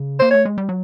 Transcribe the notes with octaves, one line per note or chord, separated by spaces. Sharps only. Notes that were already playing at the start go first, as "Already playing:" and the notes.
Already playing: C#3
A#3 C5
A3 C#5
G#3
G3
F#3